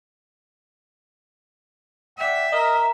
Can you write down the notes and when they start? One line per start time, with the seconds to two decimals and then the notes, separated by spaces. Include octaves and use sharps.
2.18 D5 E5 F#5 G5
2.52 A#4 D#5